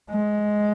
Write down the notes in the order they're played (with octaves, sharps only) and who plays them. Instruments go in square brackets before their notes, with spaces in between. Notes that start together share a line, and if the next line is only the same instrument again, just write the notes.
[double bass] G#3